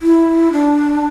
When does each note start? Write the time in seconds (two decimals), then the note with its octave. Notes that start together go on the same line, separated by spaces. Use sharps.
0.02 E4
0.52 D4